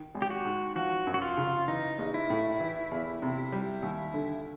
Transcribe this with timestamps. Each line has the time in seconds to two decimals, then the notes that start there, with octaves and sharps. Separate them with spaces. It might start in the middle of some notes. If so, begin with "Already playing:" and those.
Already playing: D#3
0.15 G#1
0.22 G4
0.30 F#4
0.45 G#2
0.75 F3 F#4
1.07 F#2
1.14 F#4
1.22 F4
1.37 C#3
1.68 E3 D#4
1.98 A#1
2.14 E4
2.30 A2
2.60 E3
2.91 E2
3.22 C3
3.52 G3
3.82 D#2
4.14 D3